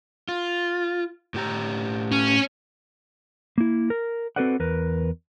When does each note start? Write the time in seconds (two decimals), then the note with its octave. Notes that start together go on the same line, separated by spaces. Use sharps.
0.28 F4
1.34 A2 G4 A#5
2.12 C#4
3.58 A#3 E4
3.90 A#4
4.36 C4 F#4 A4 B4 D5 F#5
4.60 E2 A#4 B4